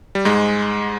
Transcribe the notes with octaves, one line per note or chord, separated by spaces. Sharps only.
G3
G#2 G#3